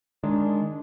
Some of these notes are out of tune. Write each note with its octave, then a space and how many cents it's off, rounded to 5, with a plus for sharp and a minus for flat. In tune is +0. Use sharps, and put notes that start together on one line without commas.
D#3 -10 G#3 +0 D4 -10